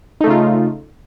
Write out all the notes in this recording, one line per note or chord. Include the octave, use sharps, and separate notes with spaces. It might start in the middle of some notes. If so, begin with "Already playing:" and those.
C#3 A3 D#4 F4